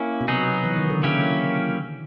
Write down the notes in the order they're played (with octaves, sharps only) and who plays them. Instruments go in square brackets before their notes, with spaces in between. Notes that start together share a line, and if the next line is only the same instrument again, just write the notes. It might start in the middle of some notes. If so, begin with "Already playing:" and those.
Already playing: [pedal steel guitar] A#3 C#4 E4
[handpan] B2
[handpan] C3 [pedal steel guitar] F#3 B3 D#4 G#4
[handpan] E3
D#3
D3
[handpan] C#3 [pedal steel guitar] F#3 A#3 C#4 E4 G4